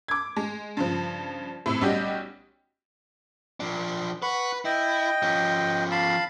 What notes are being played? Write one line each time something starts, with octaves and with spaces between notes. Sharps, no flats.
D6 G#6
G#3
G2 C#3 F3
A2 C3 E6
B1 G3 C#4 F#4 G4 D#5
F3 D4
B4 F#5 B5 C#6
E4 D#5 G5
F3 C#4
F5 A5 B5